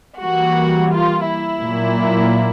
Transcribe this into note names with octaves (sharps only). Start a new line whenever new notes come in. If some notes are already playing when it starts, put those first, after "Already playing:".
E3 G3 A#3 F#4
F4
E4
A#2 F#3 A#3